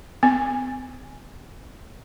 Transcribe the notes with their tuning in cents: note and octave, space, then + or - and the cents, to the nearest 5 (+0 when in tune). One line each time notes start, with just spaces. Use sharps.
B3 +45 G#5 -5